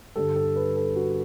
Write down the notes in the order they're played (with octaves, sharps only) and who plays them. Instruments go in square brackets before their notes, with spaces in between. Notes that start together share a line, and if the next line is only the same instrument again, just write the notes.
[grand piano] G2 D3 G3 A4
A4
B4
A4
F#4